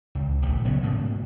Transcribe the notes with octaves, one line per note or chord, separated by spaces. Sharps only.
C#2
D1 A#1 F3 A3
C#3 F#3 A3 B3
D2 G#2 B2 A#3